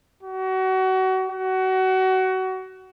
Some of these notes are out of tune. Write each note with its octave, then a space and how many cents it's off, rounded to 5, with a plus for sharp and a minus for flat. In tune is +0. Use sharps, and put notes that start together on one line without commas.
F#4 +30
F#4 +25